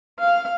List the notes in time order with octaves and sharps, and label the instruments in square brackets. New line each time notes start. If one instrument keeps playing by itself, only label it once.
[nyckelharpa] F5